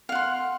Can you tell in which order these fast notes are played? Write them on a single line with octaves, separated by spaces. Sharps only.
F5 F#5 C6